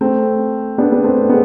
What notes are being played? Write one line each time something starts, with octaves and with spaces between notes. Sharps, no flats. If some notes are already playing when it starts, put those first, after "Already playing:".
A3 C4
B3 D4
B3
A3 C4
G#3 B3